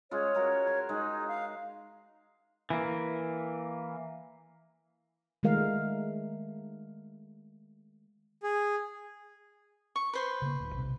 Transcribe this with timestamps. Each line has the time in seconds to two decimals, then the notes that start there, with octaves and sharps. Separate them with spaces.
0.11 G#3 C#4 F4 C#5
0.34 F#4 A#4 G#5
0.67 C6
0.89 G#3 D#4
1.28 F5
2.70 E3 A#3
5.43 D#3 G#3 A3 A#4 F5
8.43 G#4
9.96 C#6
10.13 B4 C5 C6
10.42 C#3 A#3
10.60 D1
10.75 B1 C3